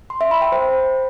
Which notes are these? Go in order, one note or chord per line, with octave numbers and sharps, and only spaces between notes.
C6
E5
B5
G5
C5